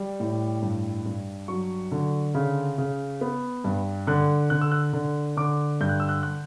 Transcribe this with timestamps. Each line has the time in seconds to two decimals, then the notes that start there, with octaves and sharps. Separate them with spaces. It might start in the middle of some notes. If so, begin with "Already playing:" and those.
Already playing: G3
0.20 A2
0.62 G2
1.06 G2
1.48 F#3 C#6
1.92 D3
2.35 C#3
2.78 C#3
3.21 B3
3.64 G2
4.07 D3 F#6
4.50 D3 F#6
4.61 E6
4.72 F#6
4.93 D3
5.37 D3 D6
5.81 G2 G6
5.89 F#6
6.00 E6
6.09 F#6
6.23 F#6